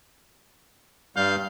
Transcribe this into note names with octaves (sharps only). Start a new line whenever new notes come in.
G2 G3 F5 G6